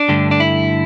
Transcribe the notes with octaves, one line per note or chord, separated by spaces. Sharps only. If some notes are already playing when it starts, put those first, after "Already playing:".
Already playing: D4
G2 D3 A3
D4
E4